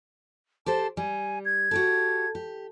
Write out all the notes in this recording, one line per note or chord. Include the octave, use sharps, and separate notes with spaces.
G4 A4 C5 A5
G3 G#5
G#6
F#4 G4 A4
G4